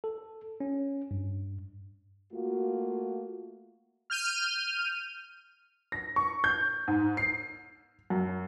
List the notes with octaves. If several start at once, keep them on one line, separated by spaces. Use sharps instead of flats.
A4
C#4
G2
A3 A#3 F4 F#4
F6 G6 D#7
A#6
C#6
G6
G#2
C7
F#2